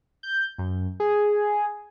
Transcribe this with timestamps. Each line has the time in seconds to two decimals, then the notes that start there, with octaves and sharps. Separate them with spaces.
0.23 G6
0.58 F#2
1.00 G#4